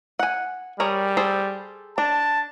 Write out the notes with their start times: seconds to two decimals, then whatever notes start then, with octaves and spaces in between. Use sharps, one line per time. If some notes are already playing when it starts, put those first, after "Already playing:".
0.19 F#5 G#5
0.80 G3 G#4 A#4 C#5
1.17 G#4 A4 C5
1.98 D4 A5